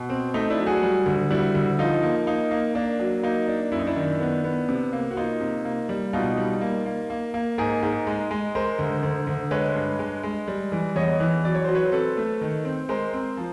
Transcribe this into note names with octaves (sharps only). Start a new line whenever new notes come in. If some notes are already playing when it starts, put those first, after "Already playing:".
Already playing: B2
C4
A3 D#4
D4 E4
F#3
F#4 G#4
G3
D2
G3 E4 F#4
D2
F3 D#4 F4
A#3
A#3 D#4
A#3
A#3 D4
F#3
A#3 D#4
D4
F#2 E4
D#4
D4 E4
D#3
B3
B3
C3
A#3
F#4
A#3 D#4 F4
C3
A#3
G3
B2 D#4 F4
G3
A#3
A#3
A#3
A#3
G#2 G#4 A#4
G#2
G#3
G#3
G#3 A#4 C5
D2
D2
D2
G#3 B4 C#5
G2
G#3
G#3
G3
E3
E2 C#5 D#5
E3
F#3 D5
C#5
F#3 C5
B4 C#5
C5
C4 A4 B4
A3
D#3
C4
G#3 A#4 C5
C4
F3